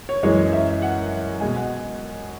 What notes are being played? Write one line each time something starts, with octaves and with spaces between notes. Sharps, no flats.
C#5
F#2 E3 G#3 C#5
E5
F#5
B2 G#3 G#5
F#5